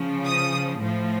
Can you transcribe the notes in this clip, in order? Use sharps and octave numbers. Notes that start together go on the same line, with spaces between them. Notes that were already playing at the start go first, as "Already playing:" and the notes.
Already playing: C#3 F3
D#6
A2 F3